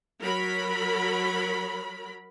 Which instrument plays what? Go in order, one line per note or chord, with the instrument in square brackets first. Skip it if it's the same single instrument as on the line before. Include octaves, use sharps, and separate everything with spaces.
[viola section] F#3 A#4 B5